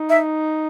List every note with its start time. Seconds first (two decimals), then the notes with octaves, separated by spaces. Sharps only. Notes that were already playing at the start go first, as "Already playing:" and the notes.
Already playing: D#4
0.09 E5